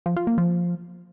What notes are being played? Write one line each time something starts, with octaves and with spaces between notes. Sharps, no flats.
F3
F4
A#3
F3